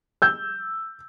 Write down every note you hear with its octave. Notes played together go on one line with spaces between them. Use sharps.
E6 G6